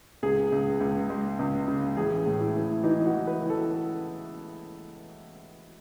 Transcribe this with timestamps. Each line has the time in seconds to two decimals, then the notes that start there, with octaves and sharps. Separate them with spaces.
0.23 C#2 G#4
0.52 C#2
0.80 C#2
1.10 G#3
1.39 C#2
1.68 C#3
1.97 A1 G#4
2.26 A2
2.40 E4
2.55 E3
2.84 E3 D#4
3.06 F#4
3.13 E3
3.27 B4
3.42 E3
3.50 A4